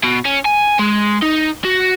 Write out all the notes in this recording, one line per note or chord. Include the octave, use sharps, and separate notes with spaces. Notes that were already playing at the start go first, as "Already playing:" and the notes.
B2
C#4
G#5
G#3
D#4
F#4